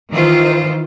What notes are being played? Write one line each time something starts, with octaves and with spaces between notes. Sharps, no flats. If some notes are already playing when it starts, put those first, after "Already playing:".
D#3 E3 F4 C5